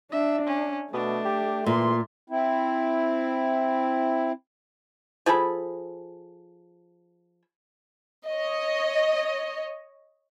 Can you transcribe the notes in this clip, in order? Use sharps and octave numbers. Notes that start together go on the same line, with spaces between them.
D4 E5
C#4
B2 A3 D4
G4
A#2 E3 C6
C4 E4
F3 G#4 A4 B5
C#5 D#5